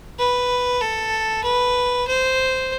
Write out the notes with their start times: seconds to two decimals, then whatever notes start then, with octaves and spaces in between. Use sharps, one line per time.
0.19 B4
0.81 A4
1.44 B4
2.07 C5